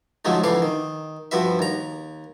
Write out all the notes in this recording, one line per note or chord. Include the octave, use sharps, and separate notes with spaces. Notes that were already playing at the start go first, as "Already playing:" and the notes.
G#2 D3 F3 F#3 G#3 A3
F2 D3 E3 D4 F5 C#6
D#3
G2 F3 F#4 B4 E5
D#2 A#5